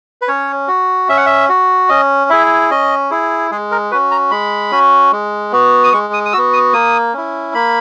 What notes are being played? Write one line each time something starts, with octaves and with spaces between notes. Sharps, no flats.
B4
C#4 C#5
F#4
C#4 E5
F#5
E5
F#4
C#4 D#5
E4 G#4 E5
C#4 D#5
E4 G#4
G#3 G#4
A#4
C#4 F#4 B4
A#5
G#3 B5
C#4 F#4
G#3
B3 F#4
D#6
G#3 C#6
D#6
D#6
B3 F#4 E6
D#6
A#3 D#6
C#4 E4
A#3 B5